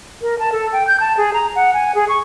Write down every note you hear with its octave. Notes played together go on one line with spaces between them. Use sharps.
A#4
A5
A4
G5
G6
A5
G#4
A#5
F#5
G#5
G#4
C#6